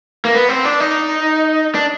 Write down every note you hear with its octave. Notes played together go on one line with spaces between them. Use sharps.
A#3
B3
C4
D4
D#4
D4